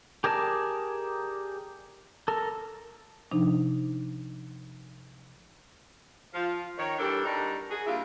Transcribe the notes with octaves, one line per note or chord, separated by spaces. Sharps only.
G4 G#4 A#4 D5 A5
A4 A#4
C3 F3 D4 D#4
F3 F4
D#3 C#5
E3 G3 D4 G4 A4 A#4
G3 D4 D#4 F#4 A#4 D5
F#4 G#4
G3 A#3 D4 E4 F4